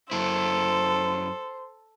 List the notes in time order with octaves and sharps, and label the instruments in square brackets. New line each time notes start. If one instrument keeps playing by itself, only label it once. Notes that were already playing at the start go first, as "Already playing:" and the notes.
[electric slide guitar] F#2 E4 [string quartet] A4 [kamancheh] C5